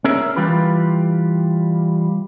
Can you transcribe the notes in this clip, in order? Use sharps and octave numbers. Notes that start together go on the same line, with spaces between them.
C#4 G#4 A#4 E5
E3 G3 F4 G4 B4